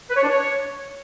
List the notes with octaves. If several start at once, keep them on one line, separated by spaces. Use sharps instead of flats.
B4
C#5
D4
C#5